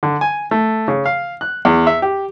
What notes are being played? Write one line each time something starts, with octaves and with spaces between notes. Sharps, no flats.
D3
G#5
A3
C#3
F5
F#6
E2
E5
G4